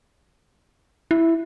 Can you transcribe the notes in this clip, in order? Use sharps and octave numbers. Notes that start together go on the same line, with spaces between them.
E4